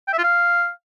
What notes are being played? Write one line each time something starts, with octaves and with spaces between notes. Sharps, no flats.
G5
E5
F4
F5